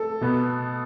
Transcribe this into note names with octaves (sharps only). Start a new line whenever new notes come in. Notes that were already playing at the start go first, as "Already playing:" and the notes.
Already playing: A4
B2 B3